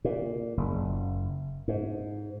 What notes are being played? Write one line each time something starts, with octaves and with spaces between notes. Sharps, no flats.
A#2
F#1
G#2